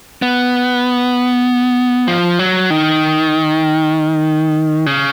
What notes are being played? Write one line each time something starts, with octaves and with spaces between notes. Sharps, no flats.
B3
F3
F#3
D#3
C#3